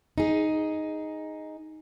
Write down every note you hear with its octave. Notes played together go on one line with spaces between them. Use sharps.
D#4 G#4